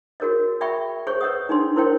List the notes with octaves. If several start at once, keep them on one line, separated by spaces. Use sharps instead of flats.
F#4 G#4 A#4 C#5 D#5
D5 E5 G5 B5 C#6
G#4 C5 C#5 C#6
B4 C#5 D#5 F#5 D#6
D4 D#4 G#4 C#5 C6
E4 A#4 C5 C#5 G5